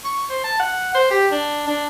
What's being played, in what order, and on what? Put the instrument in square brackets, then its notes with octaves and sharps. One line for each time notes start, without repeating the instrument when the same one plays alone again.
[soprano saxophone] C#6
C5
A5
F#5
C5
G4
D4
D4